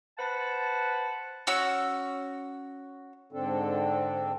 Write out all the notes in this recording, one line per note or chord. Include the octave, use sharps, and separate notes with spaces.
B4 C5 F#5 A5
C#4 F#4 E6
G#2 D3 C4 D4 A4